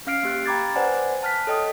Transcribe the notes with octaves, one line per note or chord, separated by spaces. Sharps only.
C#4 F5 F6 C7 D7
A#3 G4 F#6
G5 A#5 B5 D6 G#6 A6
B4 C5 D5 F#5 G#5
A5 F6 F#6 B6
A4 C#5 D#5 G5 D#6